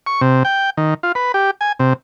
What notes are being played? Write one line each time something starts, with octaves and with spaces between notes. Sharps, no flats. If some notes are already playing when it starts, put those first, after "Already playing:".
C#6
C3
G5
D#3
F4
B4
G4
G#5
C3